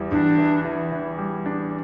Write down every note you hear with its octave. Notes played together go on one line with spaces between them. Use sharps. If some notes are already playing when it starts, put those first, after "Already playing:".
Already playing: E2 E3 G3
E2 D4
E3
E3
E3
G3
D4